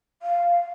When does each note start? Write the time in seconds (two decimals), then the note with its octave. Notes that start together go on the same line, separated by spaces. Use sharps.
0.22 F5